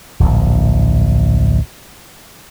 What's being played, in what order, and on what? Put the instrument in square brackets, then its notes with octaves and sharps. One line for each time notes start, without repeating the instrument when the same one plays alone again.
[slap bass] D1 A#1